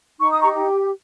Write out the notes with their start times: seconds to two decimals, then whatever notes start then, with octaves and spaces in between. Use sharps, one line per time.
0.19 D#4 C#6
0.30 D#6
0.40 G4 A#5 C#6